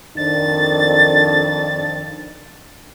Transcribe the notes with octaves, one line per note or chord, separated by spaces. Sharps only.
F2 D#3 D4 A6